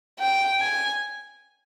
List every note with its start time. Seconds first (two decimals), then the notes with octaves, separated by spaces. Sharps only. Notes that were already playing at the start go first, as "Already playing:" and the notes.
0.19 G5
0.60 G#5